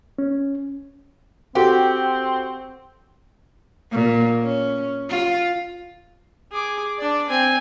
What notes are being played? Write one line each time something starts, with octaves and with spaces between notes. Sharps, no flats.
C#4
C4 F#4 G4 A4
A#2
C#4
F4
G#4 D6
D4 D5
C4 G#5